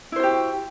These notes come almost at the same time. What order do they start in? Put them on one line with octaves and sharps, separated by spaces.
E4 C5 F#4 G4